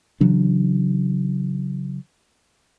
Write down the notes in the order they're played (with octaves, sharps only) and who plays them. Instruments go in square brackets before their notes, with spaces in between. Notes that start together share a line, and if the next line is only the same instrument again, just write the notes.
[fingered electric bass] C#3 E3 F#3 D4